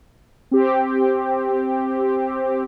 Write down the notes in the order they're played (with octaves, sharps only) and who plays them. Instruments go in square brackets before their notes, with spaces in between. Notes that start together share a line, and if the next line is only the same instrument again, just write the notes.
[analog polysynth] C4 G4